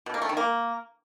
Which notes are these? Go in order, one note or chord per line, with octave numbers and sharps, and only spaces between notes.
B2
A#3
A3
D#3
A#3